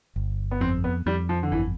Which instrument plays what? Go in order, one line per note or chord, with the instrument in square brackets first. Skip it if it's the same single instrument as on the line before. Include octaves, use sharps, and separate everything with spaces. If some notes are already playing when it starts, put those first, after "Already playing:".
[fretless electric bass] G1
[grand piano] B3
[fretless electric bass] F2 [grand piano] C4
[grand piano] B3
[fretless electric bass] F2 [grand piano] G3
[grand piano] F3
D3
[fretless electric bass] G1 [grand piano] E3